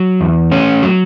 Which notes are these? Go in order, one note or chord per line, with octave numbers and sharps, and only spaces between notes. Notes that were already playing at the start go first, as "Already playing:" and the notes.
Already playing: F#3
E2
A3 C#4 C#5
F#3